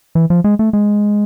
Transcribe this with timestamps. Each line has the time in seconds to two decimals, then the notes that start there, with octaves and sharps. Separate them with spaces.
0.15 E3
0.30 F3
0.44 G#3
0.59 A3
0.73 G#3